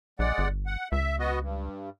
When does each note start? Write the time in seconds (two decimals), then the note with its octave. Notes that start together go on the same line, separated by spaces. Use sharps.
0.19 A#1 G#3 D5 F#5
0.38 G1
0.67 F#5
0.92 C#2 E5
1.19 B3 F#4 D#5
1.40 G2